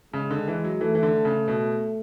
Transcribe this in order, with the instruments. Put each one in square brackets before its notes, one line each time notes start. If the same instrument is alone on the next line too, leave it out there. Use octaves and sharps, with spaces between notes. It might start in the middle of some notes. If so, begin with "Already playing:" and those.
[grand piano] C#3 [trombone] G#3
[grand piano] D3
E3
F#3
[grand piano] E3 [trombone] A3
[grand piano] E3
D3
C#3
B2